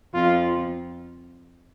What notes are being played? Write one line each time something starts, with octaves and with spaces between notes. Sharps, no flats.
F2 F4